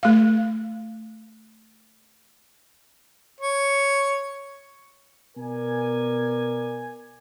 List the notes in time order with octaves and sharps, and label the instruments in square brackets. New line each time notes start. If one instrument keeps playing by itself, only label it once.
[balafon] A3 F5
[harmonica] C#5
[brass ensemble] B2 A#4 D5 G#5